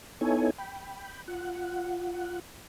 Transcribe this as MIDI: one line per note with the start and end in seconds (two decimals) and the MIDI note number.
0.21 0.51 59
0.21 0.51 63
0.21 0.51 64
0.21 0.51 69
0.21 0.51 73
0.21 0.51 80
0.58 1.22 79
0.58 1.22 83
1.28 2.40 65
1.28 2.40 78